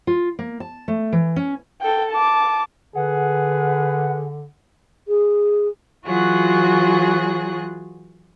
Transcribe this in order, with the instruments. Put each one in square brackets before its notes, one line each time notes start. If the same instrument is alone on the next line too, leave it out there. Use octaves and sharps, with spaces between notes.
[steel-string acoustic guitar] F4
A#3
A5
A3
E3
C#4
[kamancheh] A4 G5
A5 D6
[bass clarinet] D3 [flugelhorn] G#4 [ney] B4 [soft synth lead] F#5
[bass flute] G#4
[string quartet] E3 F#3 F4 F#4 G#4 F#6